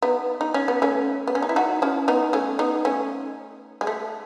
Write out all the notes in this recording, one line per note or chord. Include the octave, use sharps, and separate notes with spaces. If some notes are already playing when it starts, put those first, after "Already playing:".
B3 D#4
D#4
C#4
B3
A3 C#4
B3
C#4
D#4
E4
D#4 F#4
C#4 E4
B3 D#4
A3 C#4
B3 D#4
A3 C#4
G#3
A3